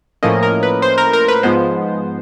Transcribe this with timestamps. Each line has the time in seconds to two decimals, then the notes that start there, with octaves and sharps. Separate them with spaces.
0.23 A2 F3 A#3 C#4 D#5
0.43 A#4
0.63 B4
0.82 C5
0.98 A#4
1.13 A#4
1.28 B4
1.43 G#2 F3 G#3 B3 C5